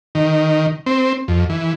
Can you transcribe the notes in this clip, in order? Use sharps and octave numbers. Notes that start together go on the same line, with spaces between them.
D#3
C4
F2
E3